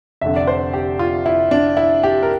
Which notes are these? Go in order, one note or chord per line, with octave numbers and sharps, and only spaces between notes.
F1 F2 D3 E5
D5
C5
G4
F4
E4
D4
E4
G4
A#4